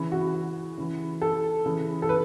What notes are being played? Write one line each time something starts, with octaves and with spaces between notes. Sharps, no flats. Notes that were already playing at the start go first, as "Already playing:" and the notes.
Already playing: C#3 E3
F#4
C#3 E3
A4
C#3 E3
A4
B4